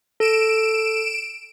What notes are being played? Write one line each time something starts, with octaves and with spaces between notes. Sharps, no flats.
A4 D7 E7